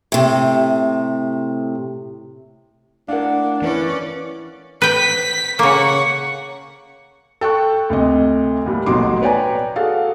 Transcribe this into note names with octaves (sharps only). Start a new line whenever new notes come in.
A2 C3
A2 D4 A#4 F5 F#5
E3 B3 C#4 E4 B4 D5
B4 G5 B6
C#3 A#3 F#5 C#6
A4 G5 C#6 F#6
D2 C3 D#5
D#2 A2 G3
A1 B2 F#3 D#4 C6 D6
B4 C#5 D5 G5 G#5 A#5
F#4 G#4 A4 F5